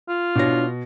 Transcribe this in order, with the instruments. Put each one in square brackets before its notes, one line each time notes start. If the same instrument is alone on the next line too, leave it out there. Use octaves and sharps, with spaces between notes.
[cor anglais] F4
[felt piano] B2 A#6 [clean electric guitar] D4 E4 C#5